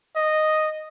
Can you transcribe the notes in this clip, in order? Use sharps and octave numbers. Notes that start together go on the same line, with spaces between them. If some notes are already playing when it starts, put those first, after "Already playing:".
D#5